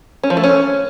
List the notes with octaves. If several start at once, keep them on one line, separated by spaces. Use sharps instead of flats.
C#4
F3
A3
C#4